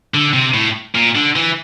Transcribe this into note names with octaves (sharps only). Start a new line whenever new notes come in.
D3
C3
A2
A#2
D3
E3